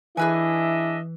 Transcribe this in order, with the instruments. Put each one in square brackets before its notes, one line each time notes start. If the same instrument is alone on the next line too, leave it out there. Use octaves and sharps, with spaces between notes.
[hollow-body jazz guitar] E3 [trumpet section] D4 D#5 E5 [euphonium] E4 [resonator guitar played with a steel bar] G#4 B4 G#5